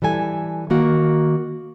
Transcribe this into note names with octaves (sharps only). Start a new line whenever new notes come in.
E3 G3 A4 G#5
D#3 A#3 F#4